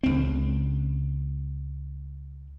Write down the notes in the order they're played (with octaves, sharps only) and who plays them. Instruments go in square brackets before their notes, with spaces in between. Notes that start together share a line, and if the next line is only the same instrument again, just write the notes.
[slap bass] C#2 C4